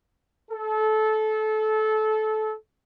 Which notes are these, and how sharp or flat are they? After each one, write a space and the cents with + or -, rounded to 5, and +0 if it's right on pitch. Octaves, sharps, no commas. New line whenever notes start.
A4 -20